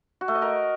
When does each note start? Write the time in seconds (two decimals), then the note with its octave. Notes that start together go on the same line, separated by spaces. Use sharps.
0.21 F#4
0.28 A3
0.35 D#5
0.42 A#4